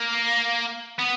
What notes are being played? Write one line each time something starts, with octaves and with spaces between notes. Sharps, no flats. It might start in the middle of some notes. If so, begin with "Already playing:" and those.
Already playing: A#3
B3